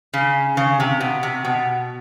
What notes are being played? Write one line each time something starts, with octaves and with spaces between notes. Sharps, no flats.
C#3
C#3
C3
B2
C3
B2